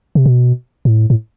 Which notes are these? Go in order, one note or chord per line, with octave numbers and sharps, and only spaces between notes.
C3
B2
A2
A2